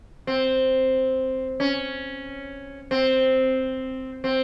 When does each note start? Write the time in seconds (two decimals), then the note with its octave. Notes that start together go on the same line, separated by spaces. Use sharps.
0.27 C4
1.60 C#4
2.91 C4
4.24 C4